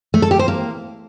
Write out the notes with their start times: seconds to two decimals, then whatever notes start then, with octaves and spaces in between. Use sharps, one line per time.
0.14 A3
0.22 A4
0.31 G4
0.39 C5
0.48 A#3